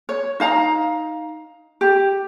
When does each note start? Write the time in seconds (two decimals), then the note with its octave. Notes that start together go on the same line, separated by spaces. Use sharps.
0.09 C#5
0.40 D#4 F5 A#5
1.81 G4